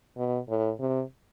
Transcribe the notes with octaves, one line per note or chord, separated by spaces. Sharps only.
B2
A2
C3